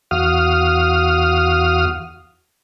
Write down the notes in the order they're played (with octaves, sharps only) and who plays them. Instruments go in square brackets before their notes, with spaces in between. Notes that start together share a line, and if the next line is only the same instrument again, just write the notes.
[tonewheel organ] E2 F#4 F5 D#6 F6